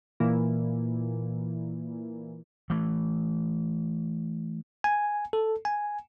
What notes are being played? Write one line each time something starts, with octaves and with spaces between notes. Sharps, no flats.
A#2 E3 A#3
E3 A3
G#5
A4
G#5